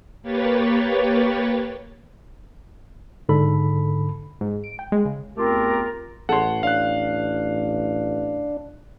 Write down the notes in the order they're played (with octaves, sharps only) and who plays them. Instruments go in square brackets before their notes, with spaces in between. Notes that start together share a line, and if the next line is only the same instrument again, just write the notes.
[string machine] A#3 G4 B4 C#5 A6
[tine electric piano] G#2 D3 A4 B5
[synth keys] G#2
D7
G5
G#3
C#3
[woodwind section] E2 A3 C4 F4 G4 A#4
[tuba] A1 [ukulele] A4 C#5 [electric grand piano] F#5 C6
[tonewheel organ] D4 [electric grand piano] F5 F#6